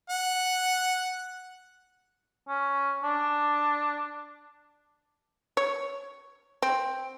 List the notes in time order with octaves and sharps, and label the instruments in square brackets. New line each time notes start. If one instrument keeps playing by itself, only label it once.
[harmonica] F#5
[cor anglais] C#4
D4
[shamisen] C#5
C4